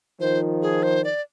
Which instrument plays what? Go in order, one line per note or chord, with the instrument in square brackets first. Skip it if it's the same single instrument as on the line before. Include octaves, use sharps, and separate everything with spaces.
[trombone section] D#3 F3 [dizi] C5
[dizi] G#4
C5
D5